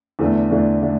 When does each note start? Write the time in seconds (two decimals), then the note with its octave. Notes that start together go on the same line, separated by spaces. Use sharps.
0.19 E2 D3 A3 D4
0.51 E2 D3 A3 D4
0.82 D3 A3 D4